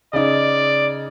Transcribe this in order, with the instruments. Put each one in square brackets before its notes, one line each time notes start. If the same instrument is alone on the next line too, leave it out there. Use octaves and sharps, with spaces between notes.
[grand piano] C#3 D#4 [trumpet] D5